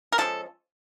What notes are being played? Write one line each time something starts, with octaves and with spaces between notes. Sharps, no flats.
A#4
F3 G#3 C#4 A4